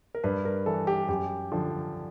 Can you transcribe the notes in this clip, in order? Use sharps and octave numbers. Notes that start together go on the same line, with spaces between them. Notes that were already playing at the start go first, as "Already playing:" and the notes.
A#4
G2 B4
A#4
E3 A4
G4
F#2 G4
D3 F3